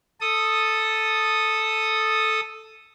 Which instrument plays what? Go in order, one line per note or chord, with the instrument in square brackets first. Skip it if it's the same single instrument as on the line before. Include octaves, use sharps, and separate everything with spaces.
[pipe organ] A4 D#6